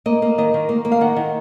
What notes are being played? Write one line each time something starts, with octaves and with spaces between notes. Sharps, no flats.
A#3 D#5
A#3
D#3 D#5
D#3
A#3
A#3
F5
D#3 F#5
D#3